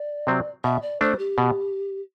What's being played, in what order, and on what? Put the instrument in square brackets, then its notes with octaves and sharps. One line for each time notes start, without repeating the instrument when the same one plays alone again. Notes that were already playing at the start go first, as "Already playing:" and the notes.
Already playing: [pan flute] D5
[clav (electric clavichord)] C3 F#3 C4
[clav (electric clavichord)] B2 [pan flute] E5
[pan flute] D5
[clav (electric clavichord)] A3 D4 [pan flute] C5
[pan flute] G4
[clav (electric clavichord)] B2